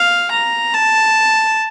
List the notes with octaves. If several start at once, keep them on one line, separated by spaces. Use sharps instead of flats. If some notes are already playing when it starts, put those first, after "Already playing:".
Already playing: F5
A#5
A5